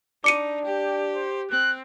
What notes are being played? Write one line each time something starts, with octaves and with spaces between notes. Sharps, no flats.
D4 D#4 D6 C#7 D#7
G4 G5
C5
C4 F#6